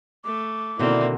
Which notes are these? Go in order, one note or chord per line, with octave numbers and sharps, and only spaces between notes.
A3 D6
B2 D3 D#3 A#3 C4 E4 D5